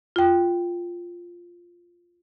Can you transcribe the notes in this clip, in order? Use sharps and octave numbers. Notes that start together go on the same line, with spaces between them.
F4 G5